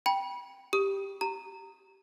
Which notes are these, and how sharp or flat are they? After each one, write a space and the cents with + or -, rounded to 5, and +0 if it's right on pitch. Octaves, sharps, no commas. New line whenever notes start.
G5 +0 B5 -30
G4 +0 D#6 +10
G4 -15 A#5 -20